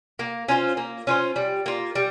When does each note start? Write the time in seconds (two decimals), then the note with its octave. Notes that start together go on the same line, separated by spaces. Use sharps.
0.19 A#3
0.48 C#4 F4 C5
0.77 A#3
1.07 C#4 F4 C5
1.36 G3
1.66 A#3 F4
1.95 G3